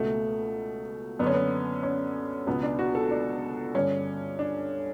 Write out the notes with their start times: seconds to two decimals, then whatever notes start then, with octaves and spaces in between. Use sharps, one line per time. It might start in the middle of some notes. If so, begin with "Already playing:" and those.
Already playing: C#2 B2 A3
1.19 F#2 B3
1.23 D3 C#4
1.34 B3
1.83 C#4
2.47 C#2 B2 B3
2.63 D4
2.79 F#4
2.95 A4
3.11 D4
3.75 G2 D3 C#4
4.39 D4